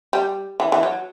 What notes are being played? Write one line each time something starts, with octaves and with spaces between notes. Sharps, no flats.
G3
E3
E3
F#3